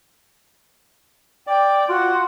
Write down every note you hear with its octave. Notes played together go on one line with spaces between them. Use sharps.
D5 G5
F4 F#4